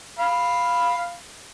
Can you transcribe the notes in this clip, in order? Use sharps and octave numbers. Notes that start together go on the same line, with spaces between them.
F5 B5